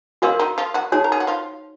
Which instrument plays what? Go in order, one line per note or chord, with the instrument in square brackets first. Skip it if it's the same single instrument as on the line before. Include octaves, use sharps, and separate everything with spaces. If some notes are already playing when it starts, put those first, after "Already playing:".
[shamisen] C#3 C#4 [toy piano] F#4 A#4 F5 C6
[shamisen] D#3 D#4
F3 F4
F#3 F#4
[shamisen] G#3 G#4 [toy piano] D#4 F#4 C#5
[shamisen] A#4
G#4
F#4
F3 F4